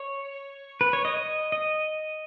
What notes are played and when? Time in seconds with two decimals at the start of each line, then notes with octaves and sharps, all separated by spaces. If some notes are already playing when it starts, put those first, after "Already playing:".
Already playing: C#5
0.81 B4
0.93 C#5
1.05 D#5
1.16 D#5
1.52 D#5